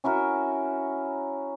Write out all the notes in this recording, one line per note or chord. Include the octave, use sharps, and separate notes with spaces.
C#4 E4 F#4 A#4